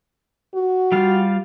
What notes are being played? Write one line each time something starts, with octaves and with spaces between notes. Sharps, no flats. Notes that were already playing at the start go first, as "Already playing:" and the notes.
F#4
G3 F4 F5